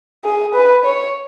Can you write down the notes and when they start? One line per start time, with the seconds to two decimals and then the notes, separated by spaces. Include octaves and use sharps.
0.24 G#4
0.54 B4
0.85 C#5